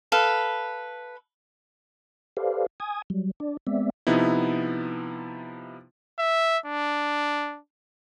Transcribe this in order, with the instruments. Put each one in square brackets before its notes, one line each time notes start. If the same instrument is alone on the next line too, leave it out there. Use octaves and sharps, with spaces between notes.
[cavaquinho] A4 B4 F5
[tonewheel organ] G4 A4 B4 C5 D5 F5
G#5 D#6 G#6
F#3 G3
D4 D5
G#3 B3 C4 D5 E5
[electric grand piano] C3 F3 B3 D#4 E4
[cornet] E5
D4